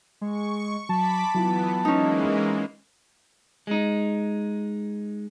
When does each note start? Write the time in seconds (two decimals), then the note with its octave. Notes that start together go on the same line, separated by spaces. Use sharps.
0.21 G#3 C#6
0.89 F#3 A5 B5 D6 B6
1.35 E3 F#3 B3 E4 F4
1.85 E3 G#3 A#3 C#4 D#4
3.67 G#3 D#4